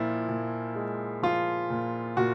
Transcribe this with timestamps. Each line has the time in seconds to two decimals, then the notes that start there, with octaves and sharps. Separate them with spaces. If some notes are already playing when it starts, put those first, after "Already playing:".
Already playing: A#2 F3 E4
0.29 A#2
0.75 G#3
1.23 F3 F4
1.70 A#2
2.17 A#2 F#4